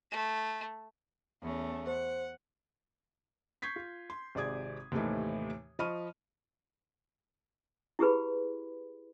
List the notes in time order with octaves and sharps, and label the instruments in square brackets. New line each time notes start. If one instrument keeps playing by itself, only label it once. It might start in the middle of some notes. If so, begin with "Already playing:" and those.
[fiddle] A3
[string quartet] E2 A3 C#4
[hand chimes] C5 [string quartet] F#5
[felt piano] C#6 G6 G#6 B6 C7
F4
C6
G#1 C3 G#4 D5 D#6 G#6
D#2 A2 C3 E3 A3 D#4
F3 D#5 B5 C#6 F6 D#7
[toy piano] E4 G4 G#4 B4 B5